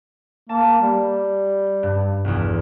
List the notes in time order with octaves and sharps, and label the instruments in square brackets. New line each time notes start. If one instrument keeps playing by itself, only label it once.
[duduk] A#3 [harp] A5
[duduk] G3
[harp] G2
B1 E2